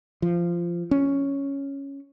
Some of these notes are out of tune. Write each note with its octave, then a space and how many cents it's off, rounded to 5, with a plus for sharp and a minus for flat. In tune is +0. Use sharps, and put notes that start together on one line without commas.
F3 -15
C#4 +0